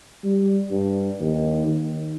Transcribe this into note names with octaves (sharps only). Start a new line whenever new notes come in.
G3
G2
D#2
D#3